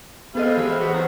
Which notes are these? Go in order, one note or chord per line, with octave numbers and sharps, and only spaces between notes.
G#3 B3 C4 A4 D#5 F5
E3 G4 B5
B3 F#4 A4
D#3 F#3 C5 A#5